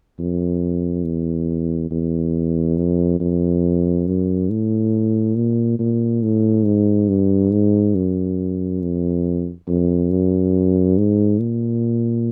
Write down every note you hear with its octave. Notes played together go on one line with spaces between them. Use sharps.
F2
E2
E2
F2
F2
F#2
A2
A#2
A#2
A2
G#2
G2
G#2
F#2
F2
F2
F#2
G#2
A#2